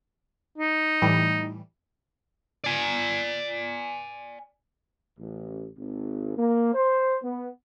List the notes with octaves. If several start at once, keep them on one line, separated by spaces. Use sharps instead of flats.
D#4
A2 E3 G3
D5 G#5
A1
G#1
A#3
C5
B3